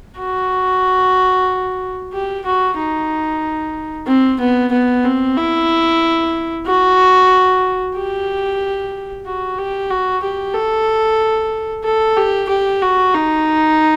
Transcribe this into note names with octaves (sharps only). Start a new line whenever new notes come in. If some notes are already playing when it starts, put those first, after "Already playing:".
F#4
G4
F#4
D#4
C4
B3
B3
C4
E4
F#4
G4
F#4
G4
F#4
G4
A4
A4
G4
G4
F#4
D#4